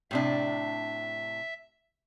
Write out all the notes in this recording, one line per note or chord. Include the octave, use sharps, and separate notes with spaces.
A2 C3 D4 E5